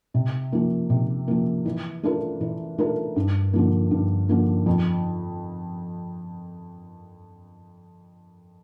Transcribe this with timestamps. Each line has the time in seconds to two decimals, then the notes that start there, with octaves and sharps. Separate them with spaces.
0.14 C3
0.52 F3 A#3
0.90 C3
1.28 F3 A#3
1.65 E3
2.03 A3 D4 F4 A#4
2.41 E3
2.78 A3 D4 F4 A#4
3.16 G2
3.53 D3 F3 A#3
3.91 G2
4.29 D3 F3 A#3
4.66 F2